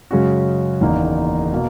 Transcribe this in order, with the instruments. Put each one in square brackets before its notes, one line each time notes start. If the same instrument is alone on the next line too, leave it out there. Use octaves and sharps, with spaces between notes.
[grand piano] F#2 C#3 G#3 C#4 F#4
F#1 E2 D#3 A#3 D#4
B2 A#3